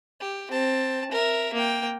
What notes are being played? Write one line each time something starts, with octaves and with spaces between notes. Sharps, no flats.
G4
C4 A5
A#4 E5
A#3 G5